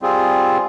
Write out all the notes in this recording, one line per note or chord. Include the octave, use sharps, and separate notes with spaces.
G3 C4 F4 G#4